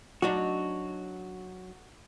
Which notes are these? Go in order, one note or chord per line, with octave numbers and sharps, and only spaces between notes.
F#3 D4 D#4 F#4